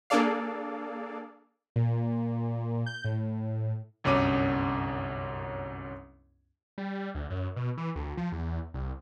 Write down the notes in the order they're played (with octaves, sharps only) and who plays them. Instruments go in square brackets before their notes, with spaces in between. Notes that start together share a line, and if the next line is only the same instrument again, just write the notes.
[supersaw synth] A#3 D4 G#4 A4 D5 F5
[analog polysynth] A#2
G6
A2
[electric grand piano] G1 C2 F#2 C#4 D6 D#7
[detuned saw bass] G3
D2
F#2
B2
E3
D2
F3
E2
C2